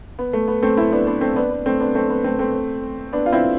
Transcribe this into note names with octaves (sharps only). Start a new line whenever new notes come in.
B3
A3
B3
A3 C4
C4 E4
B3 D4
B3 D4
A3 C4
B3 D4
B3
A3 C4
B3 D4
A3 C4
B3
A3 C4
A3 C4
B3 D4
F4
C4 E4